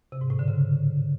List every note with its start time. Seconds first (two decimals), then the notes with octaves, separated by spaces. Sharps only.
0.12 C3
0.21 G#2
0.30 A2
0.39 D3
0.48 C#3